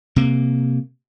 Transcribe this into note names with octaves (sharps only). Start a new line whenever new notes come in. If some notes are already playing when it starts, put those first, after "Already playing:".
C3 A#3